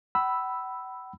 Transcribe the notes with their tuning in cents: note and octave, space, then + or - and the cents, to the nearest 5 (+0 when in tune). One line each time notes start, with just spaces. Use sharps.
F#5 +45 B5 +0 E6 +0